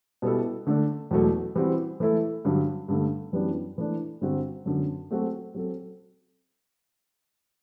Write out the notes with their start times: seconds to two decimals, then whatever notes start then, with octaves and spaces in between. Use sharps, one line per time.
0.22 B2 G3 B3 E4 A4
0.67 D3 A3 D4 A4
1.11 E2 B2 F#3 A3
1.55 E3 G3 C4 F#4
2.00 E3 A3 E4 A4
2.45 G2 D3 F#3
2.88 G2 D3 A3
3.33 F#2 E3 G3 B3 D4
3.78 E3 A3 D4
4.21 G2 D3 G3 C4 F#4
4.66 F#2 D3 F#3 B3
5.11 F#3 A3 C4 F#4 A4
5.54 F#3 C4 F#4 A4